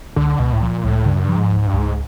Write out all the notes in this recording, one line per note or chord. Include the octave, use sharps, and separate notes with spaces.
C#2 D3
C#2 B2
A2
A#2 F3
C#2 A2
G2 C#3
F#2
G2 F3
G#2
C#2
G2
C#2
G#2